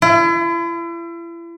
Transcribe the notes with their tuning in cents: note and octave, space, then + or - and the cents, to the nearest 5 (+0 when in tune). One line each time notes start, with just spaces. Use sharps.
E4 +40